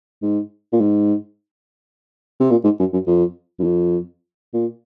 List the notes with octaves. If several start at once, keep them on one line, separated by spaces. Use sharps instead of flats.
G#2
A#2
G#2
C3
A#2
G#2
F#2
F#2
F2
F#2
F2
A#2